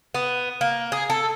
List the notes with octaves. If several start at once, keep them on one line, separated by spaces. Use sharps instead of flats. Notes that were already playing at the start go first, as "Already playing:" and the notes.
B3
A#3
G#4
A4